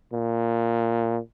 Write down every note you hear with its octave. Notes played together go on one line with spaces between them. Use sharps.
A#2